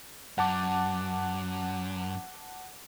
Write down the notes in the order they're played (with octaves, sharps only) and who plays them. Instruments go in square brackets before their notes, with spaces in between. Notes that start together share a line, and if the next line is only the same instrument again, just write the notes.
[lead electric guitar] F#2 [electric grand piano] F#5 A5 D6